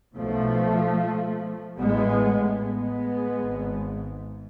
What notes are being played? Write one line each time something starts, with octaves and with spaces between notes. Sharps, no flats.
B1 B2 F3 A3
A1 A2 G#3 B3
G#3 B3
G#1 G#2